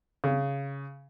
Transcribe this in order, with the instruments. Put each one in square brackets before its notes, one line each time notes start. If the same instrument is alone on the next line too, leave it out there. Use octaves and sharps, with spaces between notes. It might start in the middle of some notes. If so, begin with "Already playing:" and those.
[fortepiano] C#3